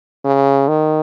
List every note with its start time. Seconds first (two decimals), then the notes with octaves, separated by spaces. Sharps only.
0.25 C#3
0.68 D#3